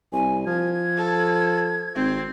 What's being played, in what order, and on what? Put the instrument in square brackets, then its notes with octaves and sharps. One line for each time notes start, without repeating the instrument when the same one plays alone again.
[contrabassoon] C2 [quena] G#5
[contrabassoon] F3 [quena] G#6
[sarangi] A4
[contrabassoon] G#1 [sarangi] C4